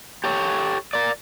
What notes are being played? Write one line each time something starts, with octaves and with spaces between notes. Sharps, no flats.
G4 A4 C#5
A#4 D5